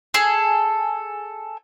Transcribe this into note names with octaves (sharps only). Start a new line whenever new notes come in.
G#4 A4